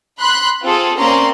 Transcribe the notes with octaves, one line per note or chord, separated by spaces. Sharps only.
B5 C6 F#6
C4 F4 G#4 A4
A#3 C4 C#4 D5 A#5 C6